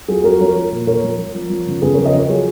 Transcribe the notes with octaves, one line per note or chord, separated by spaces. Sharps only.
F#3 F4 G#4
F#3 F#4 A#4
F3 A#4 C#5
F3
A#2
A#2 A#4 C#5
F3
F3
F3
F3
C#3
C#3 G#4 B4
F3 A#4 C#5
B4 D#5
F3 A#4 C#5
F#3 F4 G#4